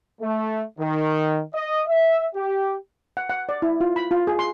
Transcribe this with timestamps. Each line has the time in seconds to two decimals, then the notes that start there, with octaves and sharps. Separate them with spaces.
0.21 A3
0.79 D#3
1.54 D#5
1.88 E5
2.35 G4
3.17 F#5
3.30 F#5
3.49 D5
3.62 E4
3.81 F4
3.96 B5
4.11 F4
4.27 G#4
4.39 C6